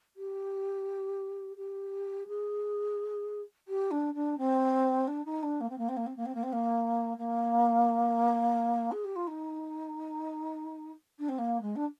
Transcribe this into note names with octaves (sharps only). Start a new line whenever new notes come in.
G4
G4
G#4
G4
D4
D4
C4
D4
D#4
D4
A#3
C4
A#3
C4
A#3
C4
A#3
C4
A#3
C4
A#3
A#3
G#4
G4
F4
D#4
D4
C4
A#3
G#3
D4